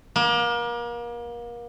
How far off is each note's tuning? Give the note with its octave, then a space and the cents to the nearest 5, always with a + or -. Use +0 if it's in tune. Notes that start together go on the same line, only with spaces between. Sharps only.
A#3 +35